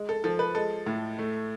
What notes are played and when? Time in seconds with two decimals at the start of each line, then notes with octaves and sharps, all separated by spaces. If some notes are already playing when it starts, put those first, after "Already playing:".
Already playing: G#3
0.09 A4
0.24 F3 A4
0.39 B4
0.55 G#3 A4
0.86 A2
1.19 A3